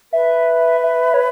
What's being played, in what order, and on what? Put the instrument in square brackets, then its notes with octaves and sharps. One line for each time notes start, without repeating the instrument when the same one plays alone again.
[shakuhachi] B4 [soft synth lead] E5
[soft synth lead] E5
C#5